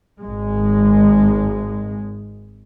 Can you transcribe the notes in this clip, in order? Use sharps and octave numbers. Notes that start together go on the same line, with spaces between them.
G#1 G#3